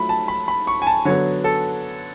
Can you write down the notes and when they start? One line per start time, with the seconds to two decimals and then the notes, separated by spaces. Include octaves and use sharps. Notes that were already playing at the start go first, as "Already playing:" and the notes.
Already playing: F#3 A3 F4 B5
0.09 A5
0.28 B5
0.48 B5
0.67 C#6
0.82 G#5
0.87 A5
1.05 D3 F#3 B3 C#5
1.44 A4